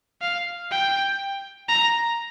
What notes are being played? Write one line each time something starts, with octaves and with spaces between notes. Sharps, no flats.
F5
G5
A#5